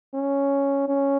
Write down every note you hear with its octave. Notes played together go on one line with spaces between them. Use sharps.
C#4
C#4